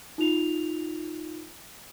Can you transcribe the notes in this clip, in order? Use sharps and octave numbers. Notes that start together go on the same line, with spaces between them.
D#4 F4 F7